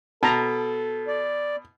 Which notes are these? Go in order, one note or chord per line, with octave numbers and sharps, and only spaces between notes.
B2 A4 A5 A#5
D5